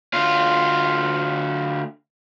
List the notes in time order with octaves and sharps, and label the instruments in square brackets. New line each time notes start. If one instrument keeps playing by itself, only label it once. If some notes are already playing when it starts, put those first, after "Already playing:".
[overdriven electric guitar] D2 F4